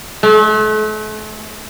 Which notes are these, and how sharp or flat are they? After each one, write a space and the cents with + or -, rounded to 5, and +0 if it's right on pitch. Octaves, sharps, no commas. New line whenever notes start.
A3 -40